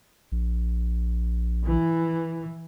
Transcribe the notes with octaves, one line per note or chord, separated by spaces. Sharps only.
A#1
E3